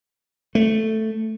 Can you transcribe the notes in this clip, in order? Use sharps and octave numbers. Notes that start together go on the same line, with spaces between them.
A3